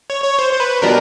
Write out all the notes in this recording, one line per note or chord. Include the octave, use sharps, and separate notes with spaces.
C#5
C#5
C5
C5
B4
B2 G3 B3 D4 A#4